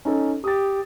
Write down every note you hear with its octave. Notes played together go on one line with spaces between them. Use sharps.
C#4 D#4 A4
G4 D#6 A6